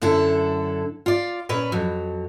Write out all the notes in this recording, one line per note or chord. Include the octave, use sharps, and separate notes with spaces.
F#2 D3 E4 A4
F4 D5
A#2 C#4 B4
F2 F#3